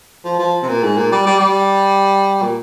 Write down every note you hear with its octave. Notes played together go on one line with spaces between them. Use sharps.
F3
F3
C3
A#2
G#2
A#2
G3
G3
G3
A#2